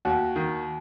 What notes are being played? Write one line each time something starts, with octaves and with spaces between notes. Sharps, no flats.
D#2 F#4
D#3